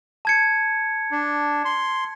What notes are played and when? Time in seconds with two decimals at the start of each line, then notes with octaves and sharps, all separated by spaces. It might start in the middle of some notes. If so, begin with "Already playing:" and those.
0.25 A5 G#6 C#7
1.11 D4
1.65 C6